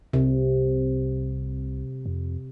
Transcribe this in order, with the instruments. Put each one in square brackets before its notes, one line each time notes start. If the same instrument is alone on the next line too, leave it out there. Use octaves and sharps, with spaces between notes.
[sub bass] C2 [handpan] C3
[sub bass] F2